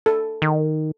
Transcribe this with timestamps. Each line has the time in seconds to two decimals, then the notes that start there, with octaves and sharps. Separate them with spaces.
0.06 A4
0.42 D#3